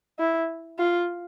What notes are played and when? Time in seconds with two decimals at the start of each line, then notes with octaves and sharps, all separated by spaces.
0.19 E4
0.79 F4